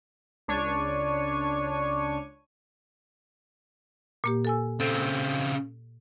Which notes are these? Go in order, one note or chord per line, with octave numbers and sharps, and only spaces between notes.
C#2 D4 C#5 C#6 C#7 D#7
A#2 A#3 G4
A4 G#5 E6
C#3 C4 A4